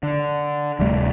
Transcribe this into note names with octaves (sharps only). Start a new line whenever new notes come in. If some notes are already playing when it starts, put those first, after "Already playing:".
D3
D1 C3 G3 A3